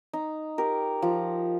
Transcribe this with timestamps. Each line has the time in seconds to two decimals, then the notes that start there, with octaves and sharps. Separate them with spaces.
0.13 D#4
0.58 G4 A#4
1.02 F3